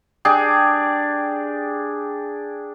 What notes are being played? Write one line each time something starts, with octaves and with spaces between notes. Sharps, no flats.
D4 G4 G#4